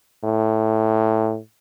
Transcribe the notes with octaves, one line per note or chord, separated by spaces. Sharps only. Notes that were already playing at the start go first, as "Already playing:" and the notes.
A2